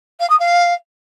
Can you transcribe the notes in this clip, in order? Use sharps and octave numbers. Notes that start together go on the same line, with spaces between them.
F5
D#6
F5